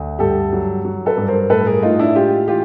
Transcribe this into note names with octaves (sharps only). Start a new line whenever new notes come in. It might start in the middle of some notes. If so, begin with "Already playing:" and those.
Already playing: D2
G2 G4 A4
F#3
F#3
A4 B4
G2
A#4 C5
A2 A4 B4
G#4 A#4
A2 D#4 F4
D4 E4
G#3 F4 G4
E3 F4 G4